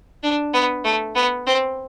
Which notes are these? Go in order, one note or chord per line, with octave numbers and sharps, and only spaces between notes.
D4
B3
A3
B3
C4